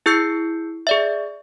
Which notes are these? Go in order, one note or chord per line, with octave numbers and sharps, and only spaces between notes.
E4 G#4 E6 G6 C7 C#7
G#4 D5 E5